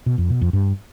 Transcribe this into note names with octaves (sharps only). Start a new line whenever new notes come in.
B2
F2
B2
F2
G2